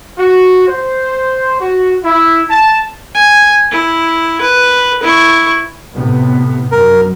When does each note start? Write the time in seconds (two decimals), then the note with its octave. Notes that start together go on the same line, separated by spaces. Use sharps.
0.18 F#4
0.67 C5
1.61 F#4
2.04 E4
2.50 A5
3.15 G#5
3.72 E4
4.41 B4
5.03 E4 C#6
5.93 A2 C3 B3
6.72 F#2 A#4